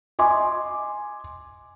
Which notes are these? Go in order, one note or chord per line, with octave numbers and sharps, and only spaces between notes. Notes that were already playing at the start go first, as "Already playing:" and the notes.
D#5 G#5 C6 D6